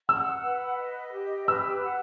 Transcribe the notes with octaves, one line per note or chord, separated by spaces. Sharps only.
F#5 E6
B4
D#5
G4
B4 E6
F#5